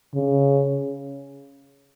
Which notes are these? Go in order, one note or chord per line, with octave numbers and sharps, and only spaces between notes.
C#3